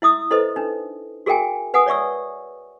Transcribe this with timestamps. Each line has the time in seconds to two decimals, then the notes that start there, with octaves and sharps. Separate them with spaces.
0.02 E4 E5 D#6 E6
0.31 E4 A4 B4 C5 D#5
0.56 D4 D#4
1.26 F#4 G#4 A#4 E5 G5 G#5
1.74 B4 F#5 G#5 D#6
1.86 C#5 D5 E5 C#6 E6